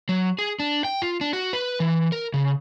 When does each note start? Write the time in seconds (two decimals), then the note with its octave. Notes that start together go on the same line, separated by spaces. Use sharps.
0.09 F#3
0.39 G#4
0.60 D4
0.84 G5
1.02 F4
1.21 D4
1.33 F#4
1.53 B4
1.80 E3
2.12 A#4
2.34 C#3